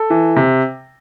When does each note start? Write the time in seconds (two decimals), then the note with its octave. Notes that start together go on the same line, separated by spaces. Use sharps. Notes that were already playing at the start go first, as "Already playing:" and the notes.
Already playing: A4
0.10 E3
0.36 C3